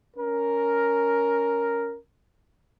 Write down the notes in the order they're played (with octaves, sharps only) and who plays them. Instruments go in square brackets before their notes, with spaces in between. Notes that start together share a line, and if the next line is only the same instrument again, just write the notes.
[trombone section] C#4 A#4